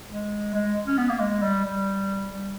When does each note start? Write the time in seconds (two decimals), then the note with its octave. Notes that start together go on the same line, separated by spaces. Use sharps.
0.09 G#3
0.53 G#3
0.87 C#4
0.98 B3
1.09 A#3
1.20 G#3
1.43 G3
1.65 G3
2.31 G3